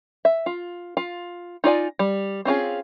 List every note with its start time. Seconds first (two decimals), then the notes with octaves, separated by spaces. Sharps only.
0.25 E5
0.46 F4
0.97 F4
1.64 D#4 F4 D5 G#5
1.99 G3
2.45 C4 C#4 F4 G#4